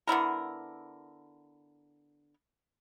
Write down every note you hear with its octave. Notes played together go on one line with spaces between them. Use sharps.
D3 B3 E4 A#4